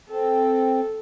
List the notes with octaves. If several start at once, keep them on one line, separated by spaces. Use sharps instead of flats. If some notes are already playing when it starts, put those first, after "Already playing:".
C4 A4